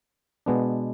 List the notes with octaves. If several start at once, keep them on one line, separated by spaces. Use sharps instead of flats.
B2 G#3 B3 D4